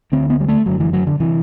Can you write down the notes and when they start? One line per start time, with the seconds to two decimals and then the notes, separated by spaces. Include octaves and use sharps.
0.12 D2 D3 C4
0.30 B3
0.40 G3
0.48 A3
0.66 F#1 F#2 D3 F#3
0.80 E3
0.93 F#3
1.07 D3
1.20 C3 E3